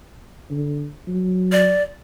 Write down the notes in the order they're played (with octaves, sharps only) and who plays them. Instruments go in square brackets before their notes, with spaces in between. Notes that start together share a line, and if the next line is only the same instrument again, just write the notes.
[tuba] D3
F#3
[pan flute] D5